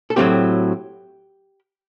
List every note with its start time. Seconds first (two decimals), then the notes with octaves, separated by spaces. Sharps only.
0.10 A4
0.16 A2 F#3 A3 C4 G4